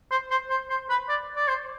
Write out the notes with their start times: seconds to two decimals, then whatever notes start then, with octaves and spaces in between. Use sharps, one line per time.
0.11 C5
0.31 C5
0.50 C5
0.70 C5
0.90 B4
1.09 D5
1.36 D5
1.48 C5